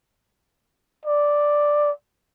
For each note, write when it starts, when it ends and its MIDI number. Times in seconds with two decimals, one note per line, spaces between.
1.05 1.91 74